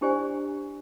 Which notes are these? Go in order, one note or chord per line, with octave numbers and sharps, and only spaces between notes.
D4 E4 G4 C5 D5 G#5